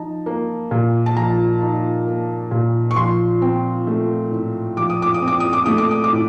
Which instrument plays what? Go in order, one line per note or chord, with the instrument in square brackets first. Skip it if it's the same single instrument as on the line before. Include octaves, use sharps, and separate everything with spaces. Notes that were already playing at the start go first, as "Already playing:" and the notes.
Already playing: [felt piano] F3 D#4 A5
A#3
A#2
A5
F3 A#5
D#4
A#3
A#2
C#6
F3 C6
C4
A3
A2
F3 D6
D#6
D6
D#6
C4
D6
D#6
D6
A3 D#6
D6
D#6
D6
A2